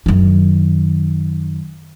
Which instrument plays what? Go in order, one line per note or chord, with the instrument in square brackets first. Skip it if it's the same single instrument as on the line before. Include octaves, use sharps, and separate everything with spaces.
[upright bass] F#2 D#3